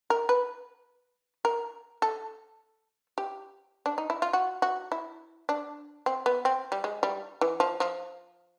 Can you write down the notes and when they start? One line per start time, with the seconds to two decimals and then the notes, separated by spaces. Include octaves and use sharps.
0.10 A#4
0.29 B4
1.45 A#4
2.02 A4
3.18 G4
3.86 D4
3.98 D#4
4.10 E4
4.22 F4
4.33 F#4
4.62 F#4
4.92 E4
5.49 D4
6.06 C4
6.26 B3
6.45 C4
6.72 G3
6.84 G#3
7.03 G3
7.41 E3
7.60 F3
7.80 F3